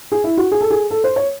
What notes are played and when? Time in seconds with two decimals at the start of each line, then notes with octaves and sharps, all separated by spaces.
0.12 G#4
0.24 E4
0.37 F#4
0.52 G#4
0.61 A4
0.70 G#4
0.91 A4
1.04 C5
1.16 C#5